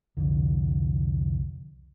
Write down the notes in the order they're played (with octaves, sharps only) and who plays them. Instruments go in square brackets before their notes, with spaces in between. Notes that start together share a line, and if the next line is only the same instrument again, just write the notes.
[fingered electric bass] C2 F2 D3